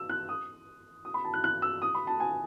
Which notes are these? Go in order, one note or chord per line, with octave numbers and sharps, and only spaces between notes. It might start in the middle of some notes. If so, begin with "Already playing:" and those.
Already playing: E6
F#6
D#6
D#6
B5
A5
F#6
F#6
E6
D#6
B5
A5
G#5